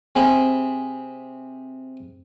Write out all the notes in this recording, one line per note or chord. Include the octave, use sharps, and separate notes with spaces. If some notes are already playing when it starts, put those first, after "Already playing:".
C3 C4 G#4 E5 B5